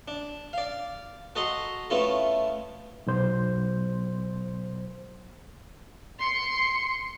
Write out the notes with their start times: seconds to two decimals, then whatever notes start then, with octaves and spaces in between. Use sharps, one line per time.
0.08 D4
0.53 D5 F5
1.36 F#4 A4 D#5 A#5 C6
1.90 A3 B3 C#4 E4 F4 A4
3.07 B1 C5
6.20 C6 C#7